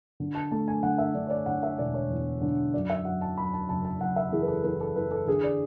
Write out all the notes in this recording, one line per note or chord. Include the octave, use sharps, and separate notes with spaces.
D3
A5
A3 A5
G#5
D3 F#5
E5
D3 D5
C#5
D5
D3 F#5
E5
E1 D5
C#5
E2
D3
F#2 D5
E5
F#2 F#5
A5
F#2 B5
A5
F#1 A5
A5
F#1 F#5
E5
E3 G#4
B4
A4
E3 B4
A4
E3 B4
A4
D3 G#4
D5